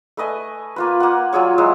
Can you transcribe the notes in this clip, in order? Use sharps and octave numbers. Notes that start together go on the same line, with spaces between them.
A3 B4 D#5 G#5
A#3 F4 B4
A#3 F#5
F#3 F4 G#4 C#5
F#3 G#3 E4 C5